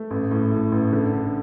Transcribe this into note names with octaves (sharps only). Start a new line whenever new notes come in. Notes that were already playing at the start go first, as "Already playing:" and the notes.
Already playing: A3
A1
A2
A2
A1
D3
D3